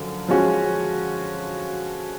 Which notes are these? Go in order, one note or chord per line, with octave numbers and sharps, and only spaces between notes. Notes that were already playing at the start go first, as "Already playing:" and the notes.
Already playing: F#2 D3 F3
F3 G#3 C#4 F#4